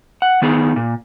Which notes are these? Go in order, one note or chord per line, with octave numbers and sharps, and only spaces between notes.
F#5
D#3 B3 D#4 G#4
A#2